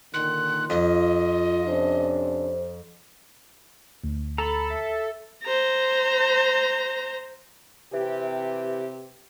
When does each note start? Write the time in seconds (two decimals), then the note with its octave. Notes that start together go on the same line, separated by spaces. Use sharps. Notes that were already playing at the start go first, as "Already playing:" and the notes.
0.14 A#2 D3 D#3 C6 F#6
0.70 F2 F4 D#5
1.67 C3 C#4 D4 C5
4.04 D2
4.38 A4 A#5 B5
4.70 E5
5.43 C5 A#5
7.93 C3 E3 G4